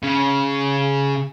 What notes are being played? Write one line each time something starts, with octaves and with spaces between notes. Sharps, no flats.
C#3